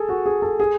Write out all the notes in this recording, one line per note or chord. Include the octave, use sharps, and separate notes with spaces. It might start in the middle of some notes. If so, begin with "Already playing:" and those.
Already playing: G#4 A4
F#4
G#4
A4
G#4